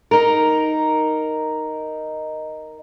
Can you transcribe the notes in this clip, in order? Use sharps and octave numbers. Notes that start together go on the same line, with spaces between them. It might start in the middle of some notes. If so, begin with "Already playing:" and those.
D#4 A#4